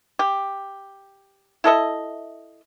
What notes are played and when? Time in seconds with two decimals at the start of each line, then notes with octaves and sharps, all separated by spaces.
0.19 G4
1.64 E4 A4 D#5 E5